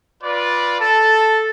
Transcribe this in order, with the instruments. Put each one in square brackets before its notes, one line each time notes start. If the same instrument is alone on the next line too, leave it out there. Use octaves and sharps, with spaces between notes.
[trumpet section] F4 B4 D5
[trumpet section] A4 [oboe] A5